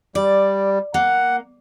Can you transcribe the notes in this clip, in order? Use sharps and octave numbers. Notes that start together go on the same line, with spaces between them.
G3 D5
A#3 F#5